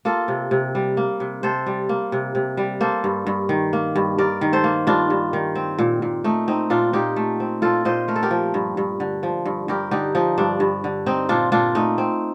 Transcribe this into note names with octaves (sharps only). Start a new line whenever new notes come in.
A#3 F4 A4
C3
C3
G3
A#3
C3
C3 A4 C5
G3
A#3
C3
C3
G3
A#3 A4 C5
G2
G2
D#3
A#3
G2
G2 A#4 D5
D#3
A4 C5
A#3
G2 D4 F4
G2
D#3
C4
A#2
A#2
A3 D#4
C4 D#4
A#2 D4 F4
A#2 D#4 G4
A3
C4
A#2 F4 A4
A#2 C5 D#5
A3 A#4
A4
G4 A#4
F3
G2
G2
D3
F3
G2
G2 G4 A#4
D3 D#4 G4
F3 D#4
G2 D4
G2
D3
C4 D#4
A#2 D4 F4
A#2 D4 F4
A3 D#4
C4